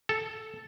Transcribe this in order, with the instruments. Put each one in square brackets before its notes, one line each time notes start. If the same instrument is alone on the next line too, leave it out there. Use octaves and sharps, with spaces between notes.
[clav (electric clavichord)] A4